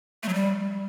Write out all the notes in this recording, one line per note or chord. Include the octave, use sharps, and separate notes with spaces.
A3
F#3
G3